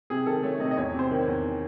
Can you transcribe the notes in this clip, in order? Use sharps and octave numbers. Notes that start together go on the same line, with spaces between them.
C3 G#4
D#3 A4
A3 C#5
C3 D#5
D#5
E2 C#5
C3 C5
D#3
C#5
E2